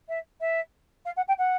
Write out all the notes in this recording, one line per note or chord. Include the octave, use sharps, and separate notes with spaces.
E5
E5
F5
F#5
G5
F#5